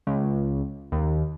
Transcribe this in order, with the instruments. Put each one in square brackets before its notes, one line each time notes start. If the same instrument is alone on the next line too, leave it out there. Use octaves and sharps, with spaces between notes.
[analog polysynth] C#2
D#2